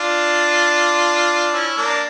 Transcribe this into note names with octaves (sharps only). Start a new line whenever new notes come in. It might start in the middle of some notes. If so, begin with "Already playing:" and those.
Already playing: D4 F4
C#4 E4
A#3 D4